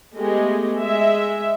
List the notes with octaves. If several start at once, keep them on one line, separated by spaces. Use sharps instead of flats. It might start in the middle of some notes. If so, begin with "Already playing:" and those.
G#3 A3 B3 G4 G#4 D#5
G#3 E5